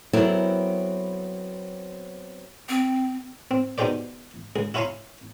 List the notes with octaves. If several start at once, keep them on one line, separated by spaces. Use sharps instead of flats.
F#3 B3 C4 E4 A4 A#4
C4
C4
B2 D#4 G4 G#4 C5 D5
C#2 G#4
E4 F4 C#5 G#5 A#5 C6